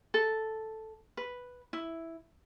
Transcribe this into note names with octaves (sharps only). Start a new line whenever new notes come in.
A4
B4
E4